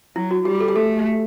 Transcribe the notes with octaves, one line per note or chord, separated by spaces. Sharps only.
F#3 E4
F#4
G3 G4
A4
G4
A3 A4